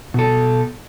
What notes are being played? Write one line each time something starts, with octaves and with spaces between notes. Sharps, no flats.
B2 A4